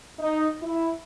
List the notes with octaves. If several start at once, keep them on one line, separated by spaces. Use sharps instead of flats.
D#4
E4